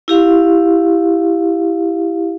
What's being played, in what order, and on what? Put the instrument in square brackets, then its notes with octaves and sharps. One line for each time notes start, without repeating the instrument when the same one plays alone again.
[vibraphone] E4 G4 F5